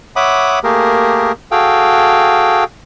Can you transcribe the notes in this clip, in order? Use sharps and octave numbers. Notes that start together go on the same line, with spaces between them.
C#5 E5 F#5 B5 D6 D#6
A3 A#3 G4 G#4 A#4
F#4 G#4 A4 F5 G5